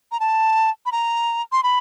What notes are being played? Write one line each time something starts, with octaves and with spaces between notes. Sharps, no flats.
A#5
A5
B5
A#5
C6
B5